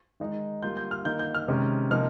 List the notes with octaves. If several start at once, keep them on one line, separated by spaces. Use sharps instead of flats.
D#3 G#3 D#4
G3 A#3 F4 G6
G6
F6
D#3 A#3 D#4 G6
G6
F6
C3 D#3 G#3 C#4
C3 F3 A#3 D#4 F6